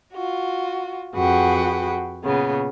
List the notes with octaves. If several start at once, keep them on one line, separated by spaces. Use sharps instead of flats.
F4 F#4
F2 F#4 G#4 B4 F#5 G5
A#2 C#3 B3